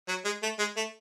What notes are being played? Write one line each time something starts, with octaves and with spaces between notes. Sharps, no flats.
F#3
G#3
A3
G#3
A3